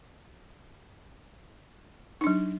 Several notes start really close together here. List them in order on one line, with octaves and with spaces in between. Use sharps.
D#4 D4 F#3